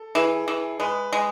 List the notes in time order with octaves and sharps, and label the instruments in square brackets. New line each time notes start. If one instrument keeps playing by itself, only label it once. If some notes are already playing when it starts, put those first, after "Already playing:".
Already playing: [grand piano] A4
[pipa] E3 [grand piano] G#4
[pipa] E3
[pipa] G#3 [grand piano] B4
[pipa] G#3